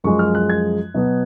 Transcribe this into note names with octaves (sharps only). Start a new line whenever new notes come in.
F#2 F3 G#3 C#6
F6
F#6
G#6
B2 F#3 B3